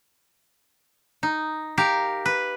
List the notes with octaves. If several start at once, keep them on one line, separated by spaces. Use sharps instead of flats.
D#4
G4 A#4 F5
B4